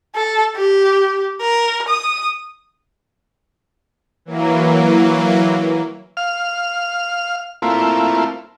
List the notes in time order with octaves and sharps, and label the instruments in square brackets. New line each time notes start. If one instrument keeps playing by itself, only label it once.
[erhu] A4
G4
A#4
D#6
[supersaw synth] E3 F#3 A#3
[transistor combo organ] F5 F6
A3 A#3 C4 E4 F4